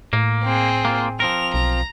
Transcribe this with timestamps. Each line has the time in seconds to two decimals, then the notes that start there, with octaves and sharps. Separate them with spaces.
0.13 A2 A#3
0.44 C4 G#4
0.85 A#3 F4
1.20 F3 C4 A#4 F7
1.54 B1 A#5